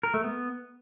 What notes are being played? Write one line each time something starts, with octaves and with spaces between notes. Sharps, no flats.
A#4
A3
B3